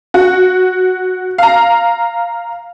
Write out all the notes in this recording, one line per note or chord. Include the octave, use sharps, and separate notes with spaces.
F#4
F5 A#5